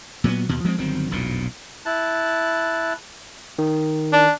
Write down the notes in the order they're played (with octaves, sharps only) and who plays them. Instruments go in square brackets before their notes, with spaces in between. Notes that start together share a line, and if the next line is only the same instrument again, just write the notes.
[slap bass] A#2 F#3 G#3 B3
D#2 B2
F3 G#3 A3 C4
G1 D#3 F#3 C4
E1 B1 F2 A#2
[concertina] E4 A5 F#6
[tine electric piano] D#3
[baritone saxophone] D4